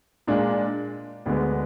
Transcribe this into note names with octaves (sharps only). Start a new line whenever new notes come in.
A#2 G#3 D4 F4
D2 D3 G#3 B3